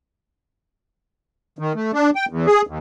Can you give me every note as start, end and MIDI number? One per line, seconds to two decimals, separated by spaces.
1.59 1.73 51
1.75 1.91 57
1.93 2.10 62
2.15 2.25 79
2.29 2.46 40
2.47 2.62 68
2.67 2.78 39